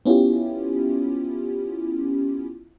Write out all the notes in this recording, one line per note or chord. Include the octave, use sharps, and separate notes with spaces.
B3 C#4 E4 F4 G4